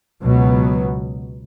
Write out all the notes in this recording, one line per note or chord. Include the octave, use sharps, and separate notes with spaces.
C#2 B2 F#3 B3